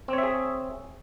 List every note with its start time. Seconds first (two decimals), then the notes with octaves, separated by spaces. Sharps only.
0.08 C4
0.13 C#5
0.18 E5
0.23 G#4